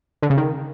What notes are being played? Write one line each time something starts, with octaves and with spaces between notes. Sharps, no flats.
D3
C#3
D#3